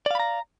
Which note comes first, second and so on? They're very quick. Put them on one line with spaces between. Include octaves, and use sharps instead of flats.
D5 F5 B5 A#5